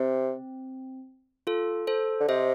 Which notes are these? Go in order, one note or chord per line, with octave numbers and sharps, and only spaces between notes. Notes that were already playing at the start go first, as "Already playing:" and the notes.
Already playing: C3 C4
F4 A4
A4 C5
D3
C3 C5 D#5